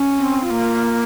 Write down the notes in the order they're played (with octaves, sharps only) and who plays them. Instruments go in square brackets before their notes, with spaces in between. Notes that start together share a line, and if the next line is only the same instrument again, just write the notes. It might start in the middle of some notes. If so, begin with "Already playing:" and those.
Already playing: [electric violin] C#4
[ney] C4
[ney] C4 [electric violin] F4
[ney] A#3